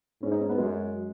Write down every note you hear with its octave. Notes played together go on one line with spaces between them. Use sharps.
G#2 C#4
D#4
C#4
B3
F#2 G#3